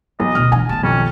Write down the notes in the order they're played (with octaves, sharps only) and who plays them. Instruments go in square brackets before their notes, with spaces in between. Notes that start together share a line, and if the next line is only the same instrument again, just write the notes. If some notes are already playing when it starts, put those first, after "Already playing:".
[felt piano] B1 [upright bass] E3 [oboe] D#5
[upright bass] D2 B2 [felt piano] F6
[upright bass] D3 E3 [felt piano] G#5
[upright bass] B1 D#3 [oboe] A5
[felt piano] F2 [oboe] C#4